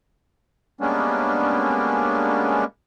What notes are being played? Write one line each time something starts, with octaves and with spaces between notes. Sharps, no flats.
G3 G#3 A#3 B3 C#4 D4